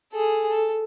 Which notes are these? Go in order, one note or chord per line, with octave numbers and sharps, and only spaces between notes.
G#4 A4
A4